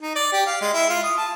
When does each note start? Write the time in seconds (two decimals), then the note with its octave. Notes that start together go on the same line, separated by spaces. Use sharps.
0.01 D#4
0.15 D5
0.33 G4
0.46 F5
0.61 G#3
0.74 E4
0.89 F4
1.04 D#6
1.18 A5